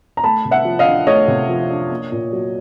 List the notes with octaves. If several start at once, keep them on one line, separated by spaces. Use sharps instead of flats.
A#5
A3 A5 B5
C3
E5 F#5
F3
D#5 F5
D4
A3 C#5 D#5
C3
F3
D4
A#3
A#2
F#3